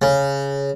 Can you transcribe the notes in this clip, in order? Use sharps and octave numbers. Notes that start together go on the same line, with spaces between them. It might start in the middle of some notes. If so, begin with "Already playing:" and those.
C#3